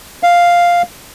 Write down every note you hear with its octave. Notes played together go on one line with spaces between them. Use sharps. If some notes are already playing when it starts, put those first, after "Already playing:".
F5